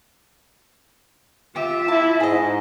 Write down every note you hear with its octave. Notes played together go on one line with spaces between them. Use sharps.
F4 G4 E5
E4 A5
G#2 G#4 D#5